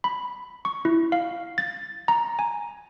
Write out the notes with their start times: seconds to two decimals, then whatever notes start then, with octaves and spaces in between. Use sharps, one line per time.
0.04 B5
0.65 C#6
0.85 E4
1.12 F5
1.58 A6
2.08 A#5
2.39 G#5